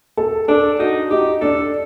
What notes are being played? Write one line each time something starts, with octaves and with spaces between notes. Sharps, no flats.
A4
D4 A4
D#4 F#4
D#4 G4
D4 A4